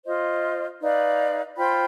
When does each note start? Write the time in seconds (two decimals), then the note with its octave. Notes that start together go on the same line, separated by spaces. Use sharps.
0.05 F4 C5 D#5
0.80 D#4 B4 D5 F5
1.56 F4 C5 G5 B5